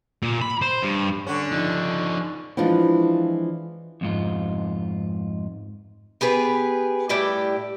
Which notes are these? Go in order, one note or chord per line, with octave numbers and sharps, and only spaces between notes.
A#2
B5
C5
G2
D3 C#4
F3 D#4
E3 F3 G#3 D4 F4
F2 G#2 F4
B3 G4 G#4 B4
A2 G3 E4 G4 D5 G5